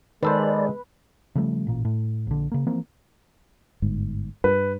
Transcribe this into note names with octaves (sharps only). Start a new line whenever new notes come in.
D#3 G#3 A4 B4 C5 D5
C#3 F3 G3 A3
A1 A#2
A2
A#1 D3
C#3 A#3
E3 F3 A#3 C4
G1 G#2
G2 B4